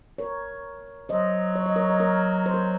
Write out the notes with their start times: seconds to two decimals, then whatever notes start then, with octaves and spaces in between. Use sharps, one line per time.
0.18 A#4 C#5
1.09 F#3 C5 D#5
1.56 C#5
1.66 D#5
1.76 A#4 C#5
1.90 D#5
2.00 A#4 C#5
2.46 C5
2.54 A#4